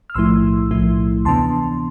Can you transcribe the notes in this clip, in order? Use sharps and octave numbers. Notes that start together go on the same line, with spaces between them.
F6
B1 A2 F3 A3 E4 C6 E6
B1 A2 F3 A3 E4
D2 C3 E3 B3 D4 A5 C6